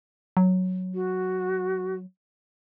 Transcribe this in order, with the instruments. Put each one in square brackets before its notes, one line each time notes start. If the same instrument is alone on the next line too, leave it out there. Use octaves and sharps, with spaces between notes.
[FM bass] F#3
[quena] F#4